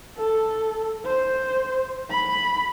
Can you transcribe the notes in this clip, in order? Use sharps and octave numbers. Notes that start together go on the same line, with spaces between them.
A4
C5
B5